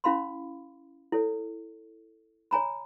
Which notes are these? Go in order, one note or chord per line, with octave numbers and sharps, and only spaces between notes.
C#4 E4 F5 B5 C6
E4 A4 C#5
C#5 G#5 A#5 B5